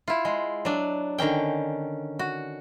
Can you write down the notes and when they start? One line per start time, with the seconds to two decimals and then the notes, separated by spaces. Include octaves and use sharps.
0.08 E4 F4
0.25 G#3
0.65 F#3 D4
1.18 D3 D#3 C#4 G5
2.19 F#4